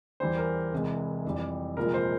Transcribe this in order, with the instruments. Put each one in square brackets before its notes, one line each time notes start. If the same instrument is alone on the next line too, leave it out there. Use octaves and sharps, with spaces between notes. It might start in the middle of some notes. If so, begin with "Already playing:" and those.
[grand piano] E2 E3 G3 C5
A#4
C2 C3 E3 G#3
F2 E3 G3
C2 A#2 F3 G#3 A#4
C5